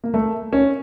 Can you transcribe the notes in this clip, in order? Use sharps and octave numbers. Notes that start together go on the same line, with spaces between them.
A#3
A3
C#4